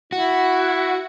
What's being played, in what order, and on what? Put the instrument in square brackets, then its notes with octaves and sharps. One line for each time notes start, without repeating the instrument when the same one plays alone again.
[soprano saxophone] E4 [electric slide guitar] F#4